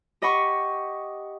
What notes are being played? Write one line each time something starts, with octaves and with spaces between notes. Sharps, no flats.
G4 D#5 F#5 B5 C#6